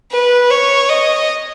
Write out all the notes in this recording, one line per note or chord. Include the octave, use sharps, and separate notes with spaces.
B4
C#5
D#5